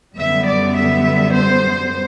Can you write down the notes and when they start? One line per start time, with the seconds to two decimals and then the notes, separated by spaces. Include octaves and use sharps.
0.16 F#2 D3 G3 B3 E5
0.46 D5
0.76 E5
1.35 C5